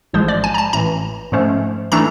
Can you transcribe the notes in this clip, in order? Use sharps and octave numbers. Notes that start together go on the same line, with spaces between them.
A1 G#2 F3 G#3 C5
D5
G#5
A#5
A5
A1 A2 E3 A#5
G#2 F3 A3 C#4
E3 A3 D4 A#5